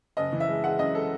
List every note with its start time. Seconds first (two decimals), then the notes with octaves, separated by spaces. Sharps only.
0.17 F#1 D#5
0.32 E3
0.40 E5
0.48 G#3
0.64 G#3 F#5
0.79 F#2 D#5
0.95 A4